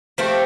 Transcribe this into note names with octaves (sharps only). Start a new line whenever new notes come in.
F3 A3 C4 G4